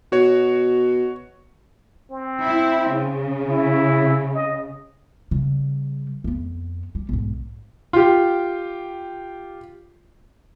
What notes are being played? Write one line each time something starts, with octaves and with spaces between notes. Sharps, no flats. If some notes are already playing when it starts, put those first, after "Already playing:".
B2 F#4 C#5
C4
E4
C#3
E4
D#5
C#3 G3
F2 B3
G3
B1 G#2
F4 G4